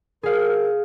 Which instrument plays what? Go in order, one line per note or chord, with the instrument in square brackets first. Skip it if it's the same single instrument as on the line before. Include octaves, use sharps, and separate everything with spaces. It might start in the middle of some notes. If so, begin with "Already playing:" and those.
[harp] G#4 F5 [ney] A#4